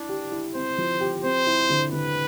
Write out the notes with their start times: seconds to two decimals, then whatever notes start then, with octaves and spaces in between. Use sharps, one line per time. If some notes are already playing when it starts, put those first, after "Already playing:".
Already playing: D4 E4
0.09 G4
0.32 E4
0.55 C4 C5
0.78 F3
1.01 G4
1.24 C4 C5
1.47 E4
1.70 D3
1.92 D3 B4